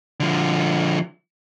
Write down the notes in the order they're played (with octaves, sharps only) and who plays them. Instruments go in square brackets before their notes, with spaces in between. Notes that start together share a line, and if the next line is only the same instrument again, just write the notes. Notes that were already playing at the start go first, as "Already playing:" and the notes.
[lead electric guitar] D3 F3